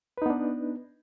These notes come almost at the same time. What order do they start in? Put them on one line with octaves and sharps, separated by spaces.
B4 D#4 B3 D4